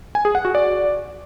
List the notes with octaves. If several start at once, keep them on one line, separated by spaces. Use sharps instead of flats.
G#5
G#4
F#5
F#4
D5